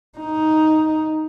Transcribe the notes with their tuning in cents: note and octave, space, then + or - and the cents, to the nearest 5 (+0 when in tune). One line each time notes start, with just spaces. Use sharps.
D#4 +5